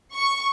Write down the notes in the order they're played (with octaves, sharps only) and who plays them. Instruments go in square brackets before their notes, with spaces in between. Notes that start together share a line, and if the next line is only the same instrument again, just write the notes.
[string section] C#6